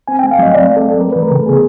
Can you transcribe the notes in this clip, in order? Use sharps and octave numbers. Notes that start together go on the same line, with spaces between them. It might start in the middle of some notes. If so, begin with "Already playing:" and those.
C4 G#5
G5
A3
F5
F#3 D#5
C4 D5
A3
A4
F#3
A3 A#4
B4
E3
A#4
C#3 A4
B3 G#4